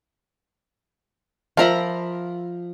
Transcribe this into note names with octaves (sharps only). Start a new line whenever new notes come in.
F3 F4 A#4 E5 A#5 B5